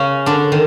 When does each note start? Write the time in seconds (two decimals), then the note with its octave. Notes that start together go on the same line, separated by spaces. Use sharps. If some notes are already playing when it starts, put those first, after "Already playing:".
Already playing: C#3 C#4
0.26 D3 D4
0.52 D#3